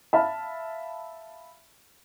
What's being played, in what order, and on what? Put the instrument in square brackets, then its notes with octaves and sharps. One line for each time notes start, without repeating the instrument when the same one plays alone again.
[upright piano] E5 F5 A5 B5 F6